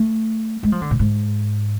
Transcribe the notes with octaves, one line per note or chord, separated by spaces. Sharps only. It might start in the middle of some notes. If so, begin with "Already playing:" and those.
Already playing: A3
G#3
F3
D3
A2
G#2